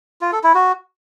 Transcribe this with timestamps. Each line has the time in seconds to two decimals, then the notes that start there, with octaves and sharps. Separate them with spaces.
0.21 F4
0.32 A4
0.44 E4
0.55 F#4